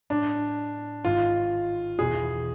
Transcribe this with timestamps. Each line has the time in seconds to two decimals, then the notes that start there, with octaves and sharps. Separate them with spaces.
0.10 A2 G#3 B3 D4
1.04 G#1 G#2 G#3 F4
1.99 E2 B2 B3 E4 G#4